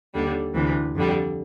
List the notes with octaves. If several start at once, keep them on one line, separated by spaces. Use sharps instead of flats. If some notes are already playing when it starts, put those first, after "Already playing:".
D#2 D3 G3
D2 C3 E3
F2 D3 G3